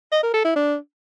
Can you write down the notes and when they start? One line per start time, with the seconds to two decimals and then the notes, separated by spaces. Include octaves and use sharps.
0.12 D#5
0.23 A#4
0.34 A4
0.45 E4
0.56 D4